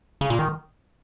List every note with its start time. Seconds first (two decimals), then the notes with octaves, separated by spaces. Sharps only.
0.21 C#3
0.30 A#2
0.39 D#3